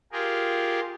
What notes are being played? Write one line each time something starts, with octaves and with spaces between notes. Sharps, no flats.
F4 G4 G#4 A#4